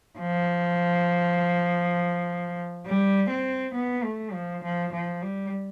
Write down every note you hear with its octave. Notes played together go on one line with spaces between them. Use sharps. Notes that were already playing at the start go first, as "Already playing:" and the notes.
F3
G3
C4
B3
A3
F3
F3
F3
G3